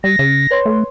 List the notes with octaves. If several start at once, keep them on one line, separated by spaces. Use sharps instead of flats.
G3 A#6
C#3
B4 C#5 C6
A3